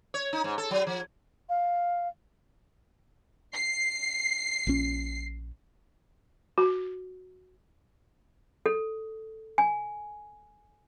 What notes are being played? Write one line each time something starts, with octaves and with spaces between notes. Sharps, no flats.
C#5
D#4
G#2
A4
F#3
F3
F5
C7
A#1 A#2 C#4
F#4
A4
G#5